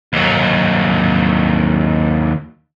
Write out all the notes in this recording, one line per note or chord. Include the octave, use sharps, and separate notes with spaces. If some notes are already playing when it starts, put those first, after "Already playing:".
D#2 F#3